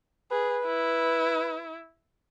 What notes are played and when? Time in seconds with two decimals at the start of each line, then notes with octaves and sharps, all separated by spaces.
0.31 G#4 B4
0.66 E4